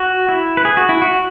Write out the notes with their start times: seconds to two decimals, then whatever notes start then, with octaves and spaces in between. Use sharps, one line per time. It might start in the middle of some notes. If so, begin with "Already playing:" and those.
Already playing: F#4
0.29 E4
0.57 B4
0.65 G#4
0.77 F#4
0.89 E4
1.02 F#4